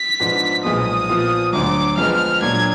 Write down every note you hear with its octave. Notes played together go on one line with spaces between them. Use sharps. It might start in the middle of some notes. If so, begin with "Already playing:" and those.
Already playing: B6
G#2 F3 B3 D4
B1 A#2 F3 G#3 B3 D#6
A#2 F3 B3 F4
D2 D3 F#3 D6
F2 F3 G#3 B3 F6
A#2 F#3 D4 G#6